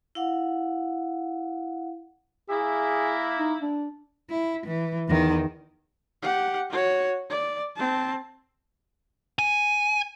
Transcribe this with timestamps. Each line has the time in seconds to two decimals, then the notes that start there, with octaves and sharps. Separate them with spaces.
0.15 E4 F5 F#5
2.49 A#3 E4 G#4
3.39 D#4
3.62 D4
4.30 E4
4.66 E3
5.08 E2 D#3
6.22 G4 F#5
6.70 F#4 C#5
7.30 D5
7.76 C4 A5
9.39 G#5